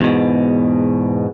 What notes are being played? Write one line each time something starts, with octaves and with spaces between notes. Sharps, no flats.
E2 G#2 B2